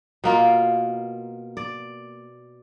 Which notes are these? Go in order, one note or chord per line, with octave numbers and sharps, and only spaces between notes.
B2 A#3 F4
D5